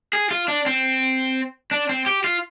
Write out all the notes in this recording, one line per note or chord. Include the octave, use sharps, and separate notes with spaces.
G#4
F4
D4
C4
D4
C4
G4
F4